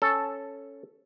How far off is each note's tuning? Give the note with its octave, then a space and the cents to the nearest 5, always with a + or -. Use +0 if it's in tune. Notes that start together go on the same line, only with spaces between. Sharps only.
C#4 +0 A4 +0